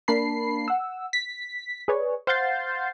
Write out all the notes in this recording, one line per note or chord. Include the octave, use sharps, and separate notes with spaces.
A#3 D4 A5 B5 C7
F#5 E6
B6
G#4 B4 C#5 D5
C5 F5 F#5 G6 A6 C7